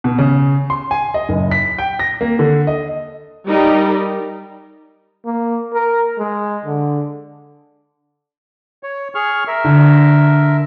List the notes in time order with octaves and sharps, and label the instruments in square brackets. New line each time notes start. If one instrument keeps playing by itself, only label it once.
[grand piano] B2
C#3
C6
G#5
D#5
F#1
B6
G5
A#6
A#3
D3
D#5
[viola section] G3 D#4 G4 A#4 D5
[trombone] A#3
A#4
G#3
D3
[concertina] C#5
G#4 C#6 F6
A#4 E5
[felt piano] D3